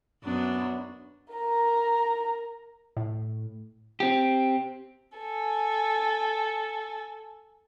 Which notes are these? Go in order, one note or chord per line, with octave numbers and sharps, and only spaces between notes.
F#2 B3 D4
A#4 A#5
A2
C4 G4
A4 G#5